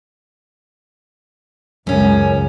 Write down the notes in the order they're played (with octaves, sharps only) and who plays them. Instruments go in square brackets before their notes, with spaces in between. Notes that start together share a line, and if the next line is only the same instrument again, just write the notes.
[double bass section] C#2 [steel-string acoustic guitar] F#2 C#4